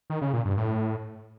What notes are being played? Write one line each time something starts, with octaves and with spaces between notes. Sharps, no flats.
D#3
C#3
A#2
G2
A2